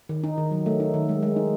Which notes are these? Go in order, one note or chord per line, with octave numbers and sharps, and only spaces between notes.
D#3
D#4
D#3
F#3
A3
D#4
D#3
G#3
G#3
D#4